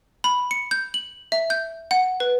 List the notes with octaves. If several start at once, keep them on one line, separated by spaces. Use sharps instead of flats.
B5
C#7
G6
F#7
E5
G6
F#5
B4